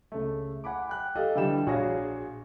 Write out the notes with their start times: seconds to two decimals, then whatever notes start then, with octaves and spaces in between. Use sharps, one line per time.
0.12 C#2 A3
0.64 F#5 G#5 B5 D6
0.89 G5 F#6
1.16 G4 A4 D#5 F5
1.35 D3 E3 F3 G3 G5 E7
1.66 A#1 F#4 G#4 C#5 F5 A#6